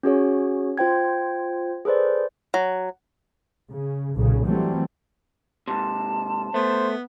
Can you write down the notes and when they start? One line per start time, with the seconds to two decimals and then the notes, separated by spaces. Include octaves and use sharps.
0.03 C#4 F#4 G#4 C#5
0.78 F4 C5 G5 G#6
1.85 G#4 A4 B4 C5 D5
2.54 F#3
3.70 C#3
4.16 B1 A#2 C#3
4.47 E3 F#3 G3 A3 C4
5.68 G#2 C3 A5
6.54 A3 B3 C5